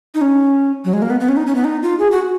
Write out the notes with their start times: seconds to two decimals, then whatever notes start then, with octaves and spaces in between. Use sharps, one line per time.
0.15 D#4
0.21 C#4
0.85 F#3
0.93 G#3
1.02 A#3
1.10 B3
1.20 B3
1.29 C#4
1.37 D#4
1.47 C#4
1.55 B3
1.64 D#4
1.82 F4
1.99 G#4
2.11 F#4